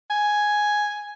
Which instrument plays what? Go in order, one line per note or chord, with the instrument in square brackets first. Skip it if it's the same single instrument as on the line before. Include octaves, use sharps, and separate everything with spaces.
[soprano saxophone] G#5